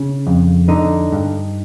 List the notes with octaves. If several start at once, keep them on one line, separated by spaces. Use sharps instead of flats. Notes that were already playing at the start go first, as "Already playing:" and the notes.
Already playing: C#3
F2
D3 D#4
G2